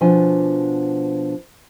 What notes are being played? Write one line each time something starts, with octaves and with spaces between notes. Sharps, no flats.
B2 F3 D4 G#5